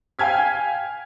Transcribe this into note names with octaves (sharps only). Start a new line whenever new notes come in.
F5 G5 G#5 F6 G#6 B6